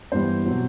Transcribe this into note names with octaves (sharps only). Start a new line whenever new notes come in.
G2 E3 G3 B3 C5
B2 F#3 C4